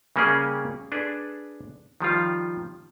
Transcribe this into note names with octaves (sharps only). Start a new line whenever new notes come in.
C#3 G3 A#3 C#4 G4 G#4
D4 G#4 A4 B4
D#3 F3 G3 F4